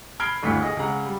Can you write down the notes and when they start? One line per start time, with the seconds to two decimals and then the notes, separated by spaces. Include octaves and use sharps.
0.20 B5 F6 G#6 C7 D7 G7
0.43 G1 D2 A2 B6 C#7
0.62 G#4 D#5
0.77 C#2 G#4 F#5 A#5
1.05 G3